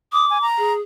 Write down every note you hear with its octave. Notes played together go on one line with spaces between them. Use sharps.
D6 D#6
G#5
A#5
G#4